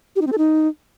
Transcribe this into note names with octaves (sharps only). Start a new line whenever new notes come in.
G4
D#4
C4
A4
D#4